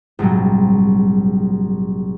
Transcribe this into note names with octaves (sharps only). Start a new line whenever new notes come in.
A#1 G#2 C3 F#3 G3